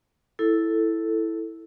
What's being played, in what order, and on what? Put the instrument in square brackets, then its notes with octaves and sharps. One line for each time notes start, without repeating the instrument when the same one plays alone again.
[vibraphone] E4 A4